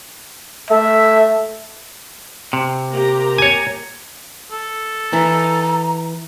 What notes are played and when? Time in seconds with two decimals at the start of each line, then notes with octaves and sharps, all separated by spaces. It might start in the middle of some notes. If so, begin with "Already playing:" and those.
0.71 A3 E5
2.53 C3
2.90 A#3 G4 A#5
3.38 C#5 G#5
4.52 A4
5.13 E3 A#5